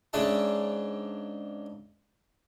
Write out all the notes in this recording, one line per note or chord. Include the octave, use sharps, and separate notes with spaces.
G#2 C#3 C#4 D4 E5 A5